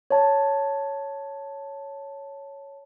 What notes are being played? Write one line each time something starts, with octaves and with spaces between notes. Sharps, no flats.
C#5 A5